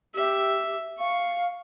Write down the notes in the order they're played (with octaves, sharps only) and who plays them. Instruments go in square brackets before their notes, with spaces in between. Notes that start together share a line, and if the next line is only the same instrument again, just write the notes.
[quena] G4 [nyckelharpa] E5
[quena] F5 [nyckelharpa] C#6